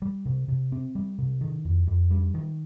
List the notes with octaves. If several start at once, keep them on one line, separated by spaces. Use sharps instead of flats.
G3
C3
C3
C4
G3
C3
D#3
F2
F2
G3
D#3